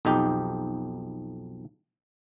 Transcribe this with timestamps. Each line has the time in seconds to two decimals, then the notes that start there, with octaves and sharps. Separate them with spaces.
0.05 B1 F2 D#4 G4